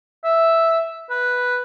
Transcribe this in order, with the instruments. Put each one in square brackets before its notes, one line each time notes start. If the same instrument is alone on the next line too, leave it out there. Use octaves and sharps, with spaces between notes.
[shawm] E5
B4